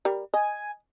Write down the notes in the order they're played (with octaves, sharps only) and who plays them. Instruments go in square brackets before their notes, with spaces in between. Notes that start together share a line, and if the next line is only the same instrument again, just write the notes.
[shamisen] G3 A#4
[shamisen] D#5 [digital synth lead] G#5